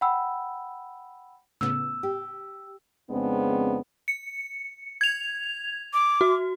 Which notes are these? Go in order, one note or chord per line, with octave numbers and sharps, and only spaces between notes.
F#5 G5 B5 E6
A2 C#3 B3 E6
G4
F2 C#3 G#3 B3 C4 D4
C#7
G#6 F7
D6
F#4